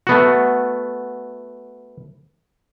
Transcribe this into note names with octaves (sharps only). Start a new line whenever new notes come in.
A3 B3 F#4